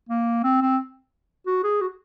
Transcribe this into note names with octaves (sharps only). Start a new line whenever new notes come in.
A#3
C4
C4
F#4
G#4
F#4